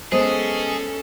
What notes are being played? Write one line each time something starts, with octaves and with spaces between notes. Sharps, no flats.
G#3 B3 C#4 G#4 A4 C5 D#6